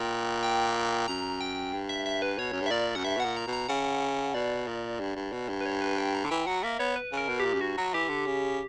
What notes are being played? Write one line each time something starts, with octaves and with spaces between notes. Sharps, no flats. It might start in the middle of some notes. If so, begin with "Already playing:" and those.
Already playing: A#2 G5
G5
F#2 A#5
G5
G2
E5
E5
B4
B2 C#5
F#2
G2
E5
A#2 D5
F#2 F#5
G2 E5
B2 F#5
A#2
A#5
B2
A#5
C#3 F#5
B2 D5
A#2
G2
G2
B2
G2
B4
C#5
B4
G5
A#5
D3
E3 G5
F#3 F#5
A#3 E5
B3 C#5
B4
C#3 A#4
B2
G4
A#2
F#2
G2 F#4
F#3
E3 G4
D3
C#3